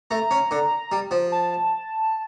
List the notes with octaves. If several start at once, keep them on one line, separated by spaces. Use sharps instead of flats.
A3 A#5
C#4
D3
G3
F3
A5